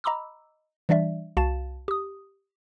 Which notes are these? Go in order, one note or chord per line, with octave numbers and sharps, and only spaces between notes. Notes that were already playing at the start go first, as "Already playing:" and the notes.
D#5 A#5 B5 D6 E6
E3 G3 D4 D5 E5
C2 F#4 F5 A5 A6 E7
G4 D#6